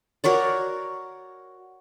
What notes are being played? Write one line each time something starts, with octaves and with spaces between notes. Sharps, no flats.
F#4 A#4 C#5 D5